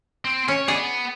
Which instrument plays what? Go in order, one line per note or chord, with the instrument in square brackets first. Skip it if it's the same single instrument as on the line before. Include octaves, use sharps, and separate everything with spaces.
[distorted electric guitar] C4
[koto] C#4 [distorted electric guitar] C#5
[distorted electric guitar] B3 [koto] G#4 D5